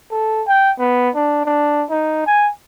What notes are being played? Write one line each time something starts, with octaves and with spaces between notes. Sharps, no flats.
A4
G5
B3
D4
D4
D#4
G#5